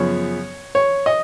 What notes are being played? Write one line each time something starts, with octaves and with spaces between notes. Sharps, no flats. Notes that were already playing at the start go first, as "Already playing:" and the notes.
Already playing: F#2 C#3 F3 B3 C#5
C#5
D#5